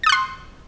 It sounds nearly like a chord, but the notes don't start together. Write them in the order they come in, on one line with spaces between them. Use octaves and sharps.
A6 D#6 F#6 C6